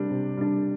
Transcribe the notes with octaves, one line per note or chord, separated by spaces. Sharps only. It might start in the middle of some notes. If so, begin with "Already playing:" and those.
Already playing: C3 G3 D4
C3
G3 D4